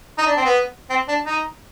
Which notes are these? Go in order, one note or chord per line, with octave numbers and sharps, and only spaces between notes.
D#4
D4
C4
B3
C4
D4
D#4